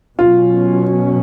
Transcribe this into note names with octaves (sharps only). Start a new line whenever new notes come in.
B2 F#3 C#4 F4